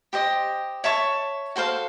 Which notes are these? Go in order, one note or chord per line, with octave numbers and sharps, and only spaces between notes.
G4 C5 D#5
C#5 E5 A5 C#6
F#4 A4 C5 F5